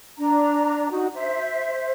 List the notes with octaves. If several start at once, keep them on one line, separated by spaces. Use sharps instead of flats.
D4 A#5
D#4 F#4
C5 E5